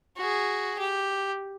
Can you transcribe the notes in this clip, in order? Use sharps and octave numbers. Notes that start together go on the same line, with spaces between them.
F#4 G#4
G4